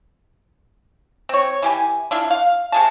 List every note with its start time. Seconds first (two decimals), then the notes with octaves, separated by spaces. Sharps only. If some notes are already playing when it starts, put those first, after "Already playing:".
1.29 C4 C#5
1.63 E3 G4 G#5
2.11 D4 E4 F4
2.30 F5
2.72 C3 G#4 A5